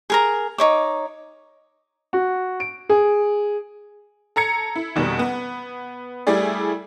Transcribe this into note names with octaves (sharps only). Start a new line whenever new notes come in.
G#4 A#4 A#5
D#4 C#5 D6
F#4
D7
G#4
A4 A#5 G#6 C#7
E4
F1 B2 D#3 G3
B3
G3 A3 E4 G#4 D5